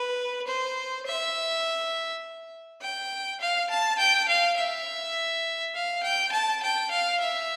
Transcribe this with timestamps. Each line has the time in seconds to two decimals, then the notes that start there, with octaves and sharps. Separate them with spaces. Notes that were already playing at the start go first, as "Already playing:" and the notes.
Already playing: B4
0.47 C5
1.06 E5
2.81 G5
3.40 F5
3.70 A5
3.98 G5
4.28 F5
4.56 E5
5.74 F5
6.03 G5
6.32 A5
6.62 G5
6.91 F5
7.20 E5